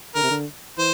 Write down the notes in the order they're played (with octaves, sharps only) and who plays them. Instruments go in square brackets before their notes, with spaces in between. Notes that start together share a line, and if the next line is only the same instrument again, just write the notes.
[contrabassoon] D3 [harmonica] A#4
[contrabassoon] C3
D3
[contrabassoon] E3 [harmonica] C5